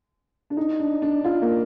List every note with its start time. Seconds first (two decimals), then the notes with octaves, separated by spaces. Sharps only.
0.50 D4
0.57 D#4
0.80 D4
1.02 D4
1.24 F4
1.42 A#3